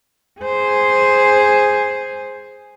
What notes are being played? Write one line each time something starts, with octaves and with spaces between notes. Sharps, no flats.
G#4 C5